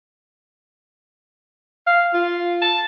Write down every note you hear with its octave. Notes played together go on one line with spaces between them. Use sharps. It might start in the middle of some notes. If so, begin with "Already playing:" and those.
F5
F4
A5